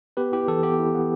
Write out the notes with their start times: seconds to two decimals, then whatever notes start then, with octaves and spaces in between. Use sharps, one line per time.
0.17 B3 G4 B4
0.32 E4 G4
0.48 E3 A4
0.63 B3 G4
0.79 E4
0.95 B3